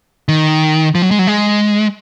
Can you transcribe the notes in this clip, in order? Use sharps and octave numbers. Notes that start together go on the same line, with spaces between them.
D#3
F3
F#3
G#3
F#3
G#3